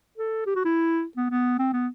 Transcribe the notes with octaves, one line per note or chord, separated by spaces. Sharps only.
A4
G4
F#4
E4
B3
B3
C4
B3